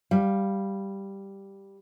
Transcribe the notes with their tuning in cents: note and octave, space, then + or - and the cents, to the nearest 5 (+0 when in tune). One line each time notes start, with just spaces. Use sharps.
G3 +0 F5 +0